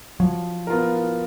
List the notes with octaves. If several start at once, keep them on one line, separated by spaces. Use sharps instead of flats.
F3 F#3
B3 F4 A#4